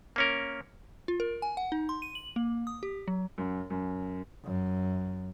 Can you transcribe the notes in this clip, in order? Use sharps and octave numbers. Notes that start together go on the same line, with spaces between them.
A#3 C#4 A#4
F4
A#4
G#5
F#5
D#4
C6
D#7
F#7
A#3
D#6
G4
F#3
F#2
F#2
F#2